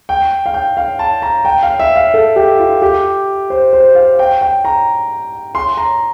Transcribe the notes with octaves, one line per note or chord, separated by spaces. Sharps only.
G5
F5
G5
F5
A5
A#5
G5
F5
E5
F5
A4
G4
F4
G4
C5
C5
F5
G5
G5
A#5
C6
A#5